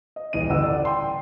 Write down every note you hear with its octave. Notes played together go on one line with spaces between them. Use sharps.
D#5
D#1 E3 D#5 D#7
A1 D2 F#5 E6
D5
G5 C6